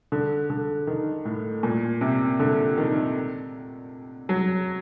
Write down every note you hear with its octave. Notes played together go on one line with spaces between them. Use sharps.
D3
D3
D#3
A2
A#2
C3
D3
D#3
F#3